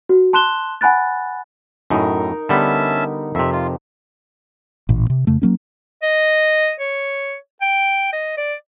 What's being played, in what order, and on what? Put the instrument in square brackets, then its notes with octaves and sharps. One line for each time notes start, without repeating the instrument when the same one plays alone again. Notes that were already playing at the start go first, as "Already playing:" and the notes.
[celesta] F#4
A5 C6 F#6 E7 G7
F#5 G#5 B5 F#6 A6
[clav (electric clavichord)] F#2 A2 [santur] D#4 A#4
[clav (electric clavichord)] D3 G3 B3 [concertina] C#4 E5 A5
[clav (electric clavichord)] F2 C3 [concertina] E5
[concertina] F4
[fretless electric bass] A1 A#2
C3
F2 C#3 A3
F#3 A#3 C#4
[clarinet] D#5
C#5
G5
D#5
D5